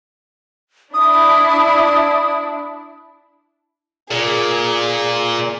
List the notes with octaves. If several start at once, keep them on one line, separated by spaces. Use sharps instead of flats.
D4 E4 D#6
A#2 G#4